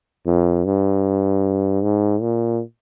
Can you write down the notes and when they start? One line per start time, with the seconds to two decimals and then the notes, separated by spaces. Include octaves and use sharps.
0.26 F2
0.65 G2
1.83 G#2
2.21 A#2